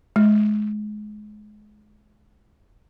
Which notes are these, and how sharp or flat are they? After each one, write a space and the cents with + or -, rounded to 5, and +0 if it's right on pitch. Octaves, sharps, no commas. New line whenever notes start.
G#3 +25